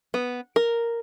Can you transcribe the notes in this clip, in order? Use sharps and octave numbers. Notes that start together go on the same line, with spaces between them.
B3
A#4